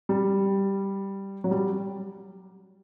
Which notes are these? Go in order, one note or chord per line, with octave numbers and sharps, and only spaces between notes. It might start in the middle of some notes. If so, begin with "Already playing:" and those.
G3
F#3
G3